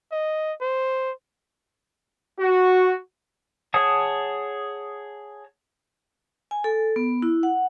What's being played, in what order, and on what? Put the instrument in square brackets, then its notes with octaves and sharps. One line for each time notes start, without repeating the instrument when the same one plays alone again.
[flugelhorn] D#5
C5
[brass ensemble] F#4
[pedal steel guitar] G#4 C#5 F#5 A5 D#6
[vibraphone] G#5
A4
B3
E4
F#5